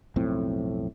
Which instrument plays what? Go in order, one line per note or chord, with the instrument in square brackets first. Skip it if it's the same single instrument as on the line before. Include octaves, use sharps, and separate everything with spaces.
[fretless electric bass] B1 F2 A2 C4